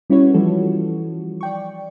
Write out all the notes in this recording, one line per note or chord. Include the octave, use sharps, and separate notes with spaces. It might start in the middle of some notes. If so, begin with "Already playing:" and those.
G3 C#4 E4 F#4 B4 C#5
E3 F3 G3 F#4 A4
D5 G5 C#6